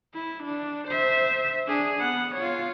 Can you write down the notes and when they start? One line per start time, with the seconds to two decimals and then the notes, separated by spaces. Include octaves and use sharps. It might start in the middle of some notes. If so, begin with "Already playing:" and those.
0.14 E4
0.43 D4
0.88 C5 E5
1.67 D4 G#4
2.00 B3 F#5
2.35 F4 C#5